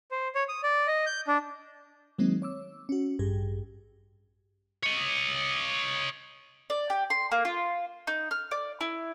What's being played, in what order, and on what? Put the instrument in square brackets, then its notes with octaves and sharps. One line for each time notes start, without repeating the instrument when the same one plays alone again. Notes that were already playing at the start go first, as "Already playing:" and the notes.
[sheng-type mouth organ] C5
C#5
D#6
D5
D#5
G6
D4
[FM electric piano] D#3 F#3 G#3 A#3 C4 D#4
C#5 D6 E6
C#4 F#4
A1 G2 G4 G#4
[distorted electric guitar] C#5 D#5
[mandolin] D5
G4
C6
A#3
F4
D#4
F6
D5
E4